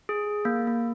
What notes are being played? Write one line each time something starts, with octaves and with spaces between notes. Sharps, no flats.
G#4
A#3
A#3